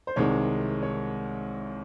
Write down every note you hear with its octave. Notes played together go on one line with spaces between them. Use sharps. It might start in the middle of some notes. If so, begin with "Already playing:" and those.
C5
C2 C3 D#3 G#3 C#5
C#5